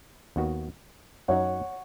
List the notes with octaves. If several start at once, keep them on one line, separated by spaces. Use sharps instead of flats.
D#2 D#3 B3 F#4
F#2 F#3 D#4 C#5 F#5